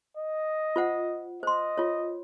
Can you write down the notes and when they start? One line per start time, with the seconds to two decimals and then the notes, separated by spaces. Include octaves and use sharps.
0.17 D#5
0.76 F4 C5 F#5
1.43 C5 D#5 C6
1.78 F4 C#5